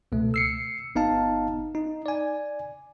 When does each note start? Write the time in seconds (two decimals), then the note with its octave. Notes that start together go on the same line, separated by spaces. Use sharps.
0.12 C#2 B2 A3
0.34 E6 C7 C#7
0.95 G1 B3 D#4 F5 A5
1.75 D#4
2.06 D5 G#5